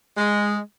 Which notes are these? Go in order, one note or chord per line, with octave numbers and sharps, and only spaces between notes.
G#3